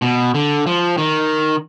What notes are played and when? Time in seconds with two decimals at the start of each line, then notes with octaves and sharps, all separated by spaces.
0.02 B2
0.34 D3
0.67 F3
0.98 D#3